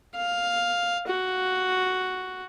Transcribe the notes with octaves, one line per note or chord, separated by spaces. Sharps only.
F5
F#4